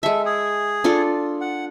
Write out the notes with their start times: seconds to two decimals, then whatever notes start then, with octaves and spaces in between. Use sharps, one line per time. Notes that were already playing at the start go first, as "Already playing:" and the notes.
0.03 G#3 A4 E5
0.25 G#4
0.84 D4 F4 A4
1.41 F#5